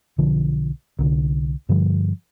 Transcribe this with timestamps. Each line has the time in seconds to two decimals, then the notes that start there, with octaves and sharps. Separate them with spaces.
0.18 B1 D3 F3
0.99 C2 D3
1.69 G2 D3 F3 G3